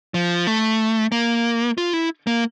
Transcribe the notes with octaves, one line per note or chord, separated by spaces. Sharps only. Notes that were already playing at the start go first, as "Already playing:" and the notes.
F3
A3
A#3
F4
E4
A#3